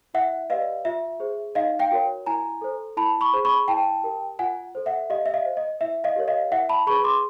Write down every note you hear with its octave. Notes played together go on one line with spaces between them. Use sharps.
E4 E5 F#5
G4 B4 D5 D#5 F5
F4 E5
G#4 C5
D#4 D#5 F5
F5 G5
F#4 A#4 C#5
E4 G#5 A#5
A4 C5
E4 A5 B5
B5 C#6
G#4 C5
B5 C#6
E4 G5 A5
G4 A#4
F4 F#5 G#5
A4 C5
E5 F#5
G4 D#5 F5
E5
D#5 F5
C5
D#5
E4 E5
D#5 F5
G4 A#4 C#5
D#5 F5
E4 E5 F#5
A5 B5
G#4 B4 B5 C#6
C6 D6